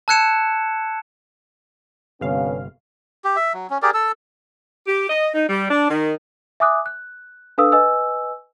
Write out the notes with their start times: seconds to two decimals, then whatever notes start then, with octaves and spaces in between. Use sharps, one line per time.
0.08 A5 E6 F#6 G#6 C#7 E7
2.21 G1 G2 C3 B3 C#4 F5
3.24 G4
3.36 E5
3.54 F#3
3.70 C#4
3.82 G4 G#4 A#4 D5
3.94 A4 E6
4.87 G4
5.10 D#5
5.34 D#4
5.49 G3
5.71 D4
5.89 D#3
6.60 E5 G#5 D6 D#6 F#6
6.86 F#6
7.58 D4 A4 B4 F5 D#6 E6
7.72 B4 D#5 G#5 E6